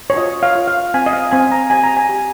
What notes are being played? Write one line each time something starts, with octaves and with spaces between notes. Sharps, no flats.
C#5
F4 D#5
F5
F4
F5
C4 G#5
D#5
F5
C4 G#5
A#5
G4 G#5
A#5
G#5
G4